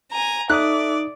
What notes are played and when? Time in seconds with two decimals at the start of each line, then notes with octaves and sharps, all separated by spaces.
0.13 G#5 A#5
0.50 D#4 A4 D5 E5 D6 D#6 F#6